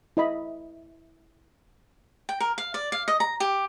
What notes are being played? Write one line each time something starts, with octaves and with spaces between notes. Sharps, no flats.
E4 D#5 B5
G5
A#4
F5
D5
F5
D#5
A#5
G4